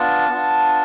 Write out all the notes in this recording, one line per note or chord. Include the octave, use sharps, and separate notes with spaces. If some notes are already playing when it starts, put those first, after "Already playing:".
Already playing: B3 D4 F4 A5
B3 D4 F4